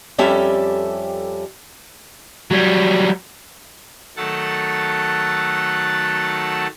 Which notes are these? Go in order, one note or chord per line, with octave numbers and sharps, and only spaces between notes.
F2 G3 C#4 G4 A4 E5
F#3 G3
D#3 F#3 A3 A4 F#5 A5